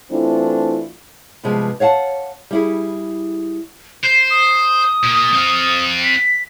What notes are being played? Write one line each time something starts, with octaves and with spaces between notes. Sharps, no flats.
E3 A3 C4 D4 E4 F4
G2 C3 F3 G#3 B3
C#5 F5 F#5 A5
G3 E4 G#4
C5 C7
D#6
A#2 A#3
C4 F5
B6